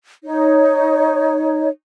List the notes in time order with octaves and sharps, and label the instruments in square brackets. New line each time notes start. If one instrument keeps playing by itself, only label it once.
[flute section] D#4 C#5